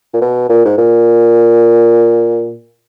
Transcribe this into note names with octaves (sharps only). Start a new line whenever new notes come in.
A#2
B2
A#2
G#2
A#2